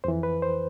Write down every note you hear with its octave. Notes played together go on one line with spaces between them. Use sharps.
F2 E3 C5
B4
C5